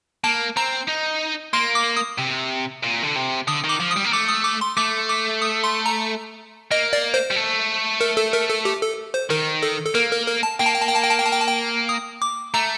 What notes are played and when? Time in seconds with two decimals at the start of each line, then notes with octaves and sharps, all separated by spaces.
0.24 A#3 A5
0.57 C4 A#5
0.88 D#4
1.53 A#3 C6
1.75 D6
1.97 D#6
2.18 C3
2.83 A#2
3.03 D3
3.16 C3
3.48 D3 D#6
3.64 D#3
3.69 D6
3.80 F3
3.91 D#6
3.97 G3
4.05 A#3
4.12 A3 D6
4.29 D#6
4.45 D6
4.61 C6
4.77 A3 D6
5.09 D6
5.42 D#6
5.64 C6
5.86 A#5
6.71 A#3 D#5
6.93 D5
7.14 C5
7.31 G3
7.36 A3
8.01 A#4
8.17 A4
8.33 A#4
8.49 A4
8.65 G4
8.81 A4
9.14 C5
9.30 D#3 A#4
9.63 A4
9.85 A4
9.95 A#3 A#4
10.11 A#4
10.27 A#4
10.43 A5
10.59 A#3 G5
10.67 A5
10.74 G5
10.82 A5
10.89 G5
10.96 A5
11.04 G5
11.11 A5
11.18 G5
11.26 A5
11.33 G5
11.40 A5
11.48 G5
11.89 D#6
12.22 D6
12.54 A3 A#5